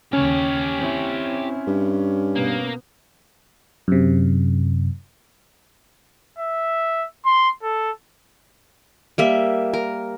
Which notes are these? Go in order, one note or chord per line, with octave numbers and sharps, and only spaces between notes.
D#2 C#3 C#4 G4 C#5
C4 E4
G2
B2 A#3 B3
F#2 C3
E5
C6
A4
G3 A#3 E5
A#4